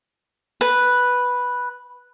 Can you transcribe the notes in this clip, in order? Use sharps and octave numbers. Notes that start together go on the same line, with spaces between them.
B4